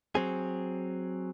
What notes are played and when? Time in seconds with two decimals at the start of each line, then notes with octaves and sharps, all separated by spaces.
0.15 F#3 C4 G#4